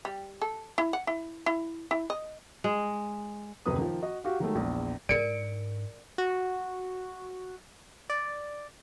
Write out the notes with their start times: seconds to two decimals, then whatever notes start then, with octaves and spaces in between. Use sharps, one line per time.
0.05 G3
0.41 A4
0.78 E4
0.93 F#5
1.07 E4
1.46 E4
1.91 E4
2.10 D#5
2.64 G#3
3.66 D#1 F#2 C3 B4 D#6
3.77 D#3 F3
4.02 F#4 D#5
4.24 F#4 G4 F5
4.40 D#3 F#3 G#3 A3
4.55 A#1 E2
5.09 G#2 D4 A#4 D5 C#7 D7
6.18 F#4
8.10 D5